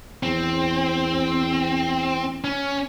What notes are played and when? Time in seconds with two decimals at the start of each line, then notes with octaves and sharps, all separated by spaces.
0.23 E2 C4
2.44 C#4